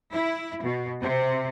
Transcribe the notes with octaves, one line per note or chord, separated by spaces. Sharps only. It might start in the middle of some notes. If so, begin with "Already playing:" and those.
E4
B2
C3